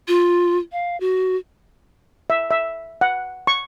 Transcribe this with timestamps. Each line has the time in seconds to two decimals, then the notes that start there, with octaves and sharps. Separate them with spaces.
0.08 F4
0.72 F5
1.00 F#4
2.30 E5
2.51 E5
3.01 F#5
3.47 C#6